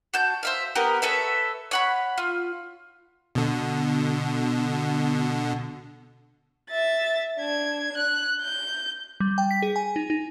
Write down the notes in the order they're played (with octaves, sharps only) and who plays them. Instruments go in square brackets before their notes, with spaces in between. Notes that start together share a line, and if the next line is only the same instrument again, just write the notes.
[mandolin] F#4 A5 G6
C5 E5 F5
B3 G4 A#4 A#5
A4 B4 C#5 E5
C#5 F#5 B5
F4
[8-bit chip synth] B2 D3
[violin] E5 A6
D4 G#6
F#6
G6
[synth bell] G3
G5
B6
G#4
G#5
D#4
D#4